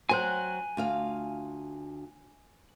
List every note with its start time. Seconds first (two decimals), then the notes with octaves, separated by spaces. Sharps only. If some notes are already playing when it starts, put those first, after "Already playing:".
0.09 F#3 C4 C5 G#5 F#6
0.77 D2 F4 F5